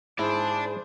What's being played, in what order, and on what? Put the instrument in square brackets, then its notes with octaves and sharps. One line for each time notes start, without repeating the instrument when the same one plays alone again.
[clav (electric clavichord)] G#2 E4 [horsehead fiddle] G#4 C5 [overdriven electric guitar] D5 A5